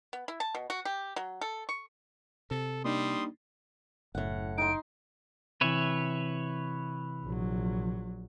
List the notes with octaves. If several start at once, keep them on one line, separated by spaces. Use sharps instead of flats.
B3
E4
A5
B2
F#4
G4
F#3
A4
C#6
C3 A4
G3 A#3 D4 D#4 C6 D#6
F#1 A2 F#5
D#4 C6 D7
C3 E3 B4 C#5 E5
A#1 F#3